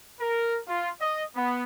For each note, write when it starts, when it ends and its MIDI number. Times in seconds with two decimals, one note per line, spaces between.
0.20 0.58 70
0.67 0.89 65
1.01 1.23 75
1.35 1.63 59